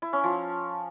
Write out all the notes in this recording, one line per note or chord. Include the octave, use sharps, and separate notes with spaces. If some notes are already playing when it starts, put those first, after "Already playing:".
E4
C#4
F3